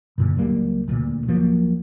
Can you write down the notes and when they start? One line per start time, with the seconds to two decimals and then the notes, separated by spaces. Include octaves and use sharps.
0.18 F#2 A#2 D3
0.36 C#2 F#3 G3 A#3
0.88 D#1 A1 D2 A#2
1.28 D#2 F3 F#3 A#3